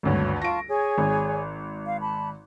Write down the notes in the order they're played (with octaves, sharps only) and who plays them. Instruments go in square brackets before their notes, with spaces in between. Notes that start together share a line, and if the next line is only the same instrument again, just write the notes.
[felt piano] G#1 D2 G2 [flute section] C#5
[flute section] F4 A5 C#6 [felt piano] A#6 D7
[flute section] G#4 C#5 G#5
[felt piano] G#1
[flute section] F5
A5 B5